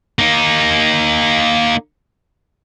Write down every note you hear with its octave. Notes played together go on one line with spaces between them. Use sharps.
A#3 D#4